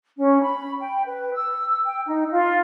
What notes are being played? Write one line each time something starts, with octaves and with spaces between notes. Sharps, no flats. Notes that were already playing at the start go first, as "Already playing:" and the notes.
C#4
B5
G5
B4
E6
G5
D#4
F4